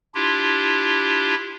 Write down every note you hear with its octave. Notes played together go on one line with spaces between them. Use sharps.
D4 E4 F4 G4